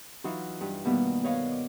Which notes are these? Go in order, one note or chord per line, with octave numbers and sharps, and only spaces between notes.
E3 F#3 D#4 F4 F#4
G2
B2 D#3 G3 A#3 B3
B4 C#5 D#5 F5
D6